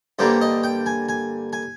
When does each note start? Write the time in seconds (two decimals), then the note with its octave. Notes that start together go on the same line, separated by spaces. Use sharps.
0.19 G2 D3 G3 A#3 C5
0.41 D#5
0.64 G5
0.86 G#5
1.09 G#5
1.53 G#5